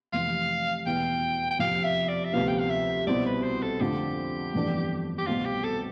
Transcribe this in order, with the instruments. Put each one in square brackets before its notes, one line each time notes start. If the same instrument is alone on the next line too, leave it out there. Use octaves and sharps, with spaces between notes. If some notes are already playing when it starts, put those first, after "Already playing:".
[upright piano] F1 F2 C3 E3 [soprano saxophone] F5
[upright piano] E2 B2 G3 B3 E4 [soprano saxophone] G5
[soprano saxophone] G5
[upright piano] F2 C3 F3 [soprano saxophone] F5
[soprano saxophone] E5
D5
E5
[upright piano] D2 C3 F3 B3 [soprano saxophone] F5
[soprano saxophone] G5
F5
E5
[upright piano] C2 B2 G3 C4 E4 [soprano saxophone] D5
[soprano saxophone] B4
C5
A4
[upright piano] F2 D3 F3 A3 C4 [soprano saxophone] G4
[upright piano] G1 F2 E3 A3 D4
[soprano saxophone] G4
[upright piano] C2 B2 A3 C4 [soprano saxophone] F4
[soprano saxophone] G4
A4